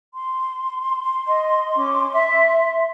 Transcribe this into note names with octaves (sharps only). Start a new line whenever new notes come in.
C6
D#5
C#4 D6
E5